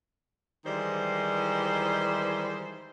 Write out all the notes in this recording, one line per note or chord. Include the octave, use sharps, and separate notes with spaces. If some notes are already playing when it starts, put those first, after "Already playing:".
D#3 E3 G3 G#3 C5